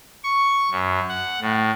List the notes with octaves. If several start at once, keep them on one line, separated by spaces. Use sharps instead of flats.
C#6
F#2
F#5
A2